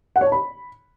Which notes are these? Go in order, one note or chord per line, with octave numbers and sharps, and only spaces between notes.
F#5
C#5
A5
B5